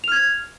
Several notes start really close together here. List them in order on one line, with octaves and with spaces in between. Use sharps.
F7 F6 G#6